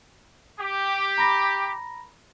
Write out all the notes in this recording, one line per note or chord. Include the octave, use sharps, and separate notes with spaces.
G4
A#5 B5 A#6